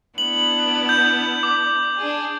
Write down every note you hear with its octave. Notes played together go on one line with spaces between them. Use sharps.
B3 D4 E4 F#7
G6
D6
D4 G#4